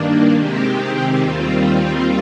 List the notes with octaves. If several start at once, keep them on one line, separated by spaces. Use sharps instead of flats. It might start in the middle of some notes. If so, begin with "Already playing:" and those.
Already playing: G2 D#3 A#3 D4
C3 D#3 G#3 C4 G4
D#2 D#3 G3 C4 F4